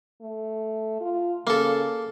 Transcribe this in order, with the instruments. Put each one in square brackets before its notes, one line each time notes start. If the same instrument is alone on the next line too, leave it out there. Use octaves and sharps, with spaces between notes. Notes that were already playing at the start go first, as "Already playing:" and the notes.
[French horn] A3
F4
[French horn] C#3 [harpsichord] A#3 A4